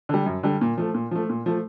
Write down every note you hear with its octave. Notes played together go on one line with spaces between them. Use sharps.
D3 G3
F#2
D3 G3
A#2
F3 A3
A#2
F3 A3
A#2
F3 A3